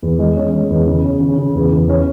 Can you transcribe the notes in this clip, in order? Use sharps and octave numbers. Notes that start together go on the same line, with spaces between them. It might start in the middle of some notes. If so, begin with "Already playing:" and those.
E2
G#3
C#4
G#3
E2
C#3
C#4
C#3
C#3
E2
E2
C#4